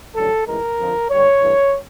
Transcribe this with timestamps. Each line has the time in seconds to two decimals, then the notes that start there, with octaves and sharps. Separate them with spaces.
0.15 A1 G2 D3 F#3 A4
0.46 A1 G#2 E3 G#3 A#4
0.78 F2 D3 F3
1.10 G2 D3 G3 C#5
1.41 G2 E3 A3